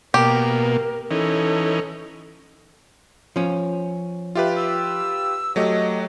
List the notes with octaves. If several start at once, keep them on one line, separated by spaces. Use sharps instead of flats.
B2 A#3 G4 A#4
E3 C#4 D#4 A4
F3 C#4
F4 G4 B4 E5
E6
F#3 A3 G4 D#5